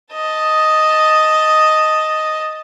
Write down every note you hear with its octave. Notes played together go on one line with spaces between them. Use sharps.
D#5 A5